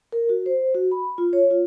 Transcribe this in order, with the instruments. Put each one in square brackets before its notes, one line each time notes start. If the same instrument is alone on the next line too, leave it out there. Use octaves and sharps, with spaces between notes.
[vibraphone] A#4
F#4
C5
F#4
B5
F4
C#5
F4